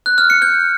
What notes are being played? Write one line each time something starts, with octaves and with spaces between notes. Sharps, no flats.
F#6
F6
C#7
G6